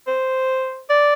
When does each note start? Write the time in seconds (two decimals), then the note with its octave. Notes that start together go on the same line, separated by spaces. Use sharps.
0.07 C5
0.90 D5